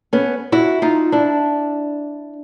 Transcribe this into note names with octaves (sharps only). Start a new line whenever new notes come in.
B3 C#4
E4 F#4
D#4 F4
D4 E4